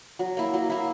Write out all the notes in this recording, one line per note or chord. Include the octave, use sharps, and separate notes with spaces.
F#3
A#3 E4
F#3
A#3 E4